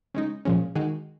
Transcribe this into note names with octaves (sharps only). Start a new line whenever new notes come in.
C#3 G#3 D#4
A#2 F3 G#3 C#4
D#3 G#3 D#4 F#4